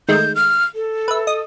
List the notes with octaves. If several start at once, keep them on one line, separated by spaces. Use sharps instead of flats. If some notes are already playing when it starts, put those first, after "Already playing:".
D#3 G#3 A3 G6
F6
A4
B4 E5
D#5 D#6